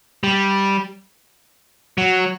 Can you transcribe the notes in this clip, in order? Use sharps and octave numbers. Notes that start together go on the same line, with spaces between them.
G3
F#3